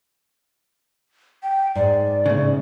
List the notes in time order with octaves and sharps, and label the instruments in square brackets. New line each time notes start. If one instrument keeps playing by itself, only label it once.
[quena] G5
[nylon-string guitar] G#2 [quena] D5
[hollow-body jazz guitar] A2 C#3